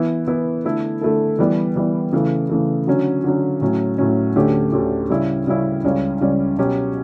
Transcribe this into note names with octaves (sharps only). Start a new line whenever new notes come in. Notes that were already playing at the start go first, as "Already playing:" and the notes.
Already playing: E3 B3 E4
E3 B3 E4
D3 A3 E4 A4
D3 A3 E4 A4
E3 G3 B3
E3 G3 B3
C#3 E3 A3
C#3 E3 A3
D3 F#3 C#4
D3 F#3 C#4
A2 F#3 C#4
A2 F#3 C#4
D2 D3 A3 C#4 G4
D2 D3 A3 C#4 G4
C#3 G3 C#4 E4
C#3 G3 C#4 E4
C#2 C#3 G3 C#4
C#2 C#3 G3 C#4
B2 F#3 C#4 G4